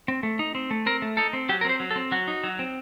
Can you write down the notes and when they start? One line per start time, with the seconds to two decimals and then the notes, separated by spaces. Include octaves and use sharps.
0.08 C4
0.23 A3
0.39 D#4
0.55 C4
0.71 A3
0.86 C4 A#4
1.02 A3
1.17 D#4 A4
1.33 C4
1.49 F#3 G4
1.61 A#4
1.65 C4 C5
1.80 F#3
1.91 A4
1.96 C4
2.12 F#3 F#4
2.28 D#4
2.44 F#3
2.59 C4